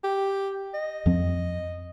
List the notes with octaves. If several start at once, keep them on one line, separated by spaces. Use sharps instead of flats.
G4
D#5
F2 F3 C4